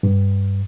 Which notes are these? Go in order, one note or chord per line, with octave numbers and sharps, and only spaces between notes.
G2